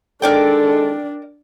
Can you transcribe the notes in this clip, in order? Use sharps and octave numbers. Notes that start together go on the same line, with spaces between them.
D#3 G#3 D4 A4 A#4 D5 G5